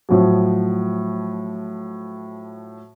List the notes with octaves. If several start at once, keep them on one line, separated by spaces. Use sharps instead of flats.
A2 F3 F#3